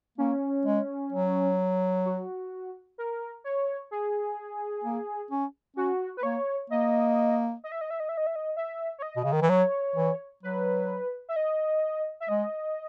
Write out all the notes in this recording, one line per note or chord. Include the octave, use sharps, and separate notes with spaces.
A#3 C#4
G#3
F#3
F#4
A#4
C#5
G#4
A#3
C#4
C#4 F#4
B4
A#3 C#5
A#3 D#5
D#5
E5
D#5
E5
D#5
E5
D#5
E5
D#5
E5
C#5
D#5
B2
C#3
D#3
E3
F#3 C#5
E3
F#3 B4
E5
D#5
E5
G#3 D#5